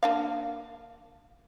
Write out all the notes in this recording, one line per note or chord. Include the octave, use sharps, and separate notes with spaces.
A#3 D4 F5